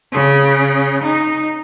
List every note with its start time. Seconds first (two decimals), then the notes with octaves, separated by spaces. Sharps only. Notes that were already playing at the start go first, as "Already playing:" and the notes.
0.13 C#3
1.04 D#4